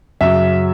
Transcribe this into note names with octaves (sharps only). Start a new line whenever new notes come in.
F#2 C#3 F#3 E5